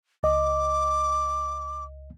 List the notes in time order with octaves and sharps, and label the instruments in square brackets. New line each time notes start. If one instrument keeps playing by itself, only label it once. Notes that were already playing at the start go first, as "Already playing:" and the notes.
[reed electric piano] C#2 D#5 [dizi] D6